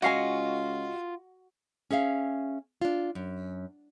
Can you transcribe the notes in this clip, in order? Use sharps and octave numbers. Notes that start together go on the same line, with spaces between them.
C#2 F4 F#4 D#5 F5 G#5
C#4 G#4 E5 F5
D4 F4
F#2